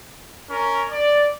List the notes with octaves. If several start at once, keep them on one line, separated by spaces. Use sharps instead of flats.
C#4 A#4
D5